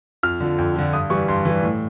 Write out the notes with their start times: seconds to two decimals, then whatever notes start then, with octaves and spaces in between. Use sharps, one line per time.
0.23 F2 F6
0.40 D3 F3
0.58 F2
0.76 D3 F3
0.93 G2 D#6
1.10 E3 G3 C#6
1.28 G2 C6
1.45 E3 G3
1.63 A2